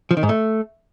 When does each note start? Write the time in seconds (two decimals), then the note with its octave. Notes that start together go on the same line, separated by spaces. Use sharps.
0.11 F3
0.17 D#3
0.23 G#2
0.29 A3